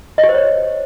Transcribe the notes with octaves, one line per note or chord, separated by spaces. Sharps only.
D#5
G4
C5
C#5